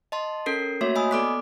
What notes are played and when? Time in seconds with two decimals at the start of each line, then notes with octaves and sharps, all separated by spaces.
0.12 D#5 A5 C6
0.46 C#4 A4 A#4 C7
0.81 A3 A#3 F#4 C#5 E5
0.96 D#5 G#5 B5 D#6 E6
1.11 B3 A4 D5 D6 F#6 B6